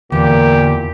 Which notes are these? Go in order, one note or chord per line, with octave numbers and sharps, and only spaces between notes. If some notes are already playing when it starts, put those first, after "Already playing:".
E2 A#2 D3 G4